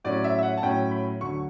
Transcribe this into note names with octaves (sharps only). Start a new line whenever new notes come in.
A2 F#3 C#4 D5
E5
E5
F#5
A5
A2 F#3 C#4 G5
B5
D2 D3 F#3 C#6